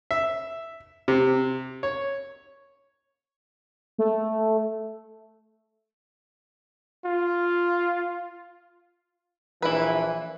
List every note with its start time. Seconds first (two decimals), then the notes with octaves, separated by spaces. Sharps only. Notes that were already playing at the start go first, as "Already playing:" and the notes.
0.11 E5
1.08 C3
1.83 C#5
3.98 A3
7.05 F4
9.62 A#1 E3 E4 B4